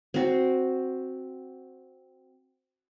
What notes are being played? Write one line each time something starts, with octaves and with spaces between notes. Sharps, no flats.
C4 F#4